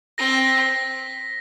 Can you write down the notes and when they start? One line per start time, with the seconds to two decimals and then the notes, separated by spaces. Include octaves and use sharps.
0.18 C4 A#6
0.48 B6